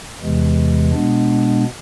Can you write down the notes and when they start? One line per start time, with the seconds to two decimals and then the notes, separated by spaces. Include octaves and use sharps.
0.21 E2 C3 E3 G#3
0.93 B2 G#3 B3 D4